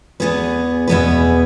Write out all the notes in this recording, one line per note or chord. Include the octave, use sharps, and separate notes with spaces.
E2 B2 B3 G#4 B4
E2 B2 B3 G#4 B4